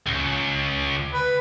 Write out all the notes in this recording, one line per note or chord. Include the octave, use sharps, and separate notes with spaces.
C#2
B4